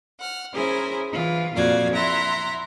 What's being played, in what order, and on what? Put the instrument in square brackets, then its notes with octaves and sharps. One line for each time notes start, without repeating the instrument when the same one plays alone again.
[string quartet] F#5 F6
C#4 E4 G#4 A#4 C5
E3 F4
F2 A#2 F4 F#4 D5 G#6
E4 E5 F#5 A#5 C6